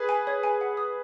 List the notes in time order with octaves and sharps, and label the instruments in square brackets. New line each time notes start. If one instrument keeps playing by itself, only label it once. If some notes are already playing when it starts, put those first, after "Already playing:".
Already playing: [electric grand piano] G#4 B4
[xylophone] G#5
C#5
G#5
F#5
D#6